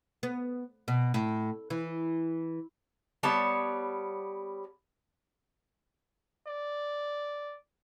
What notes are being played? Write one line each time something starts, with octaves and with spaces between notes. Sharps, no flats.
B3
B2
A2
E3
G3 B3 C#5 A5
D5